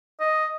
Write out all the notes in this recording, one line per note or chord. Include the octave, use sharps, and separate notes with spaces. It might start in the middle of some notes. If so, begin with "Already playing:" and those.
D#5